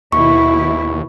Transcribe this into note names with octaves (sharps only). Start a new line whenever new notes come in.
D#2 B2 E4 C#6